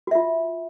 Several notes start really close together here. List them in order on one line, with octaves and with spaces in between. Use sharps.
F#4 E5 F4